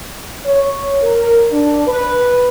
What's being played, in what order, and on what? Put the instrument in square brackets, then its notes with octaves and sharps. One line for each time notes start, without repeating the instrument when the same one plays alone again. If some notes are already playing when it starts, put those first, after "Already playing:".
[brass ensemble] C#5
A#4
D4
B4